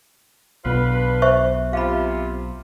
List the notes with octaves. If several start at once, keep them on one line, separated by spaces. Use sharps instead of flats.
B1 B2 D4 F4 B4
C5 E5 C#6
C3 F4 F5 B5